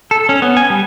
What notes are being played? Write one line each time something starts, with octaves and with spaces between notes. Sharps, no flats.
A4
C#4
B3
G#5
G3